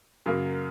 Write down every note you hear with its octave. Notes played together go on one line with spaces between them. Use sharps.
F#2 C#3 F#3 A#3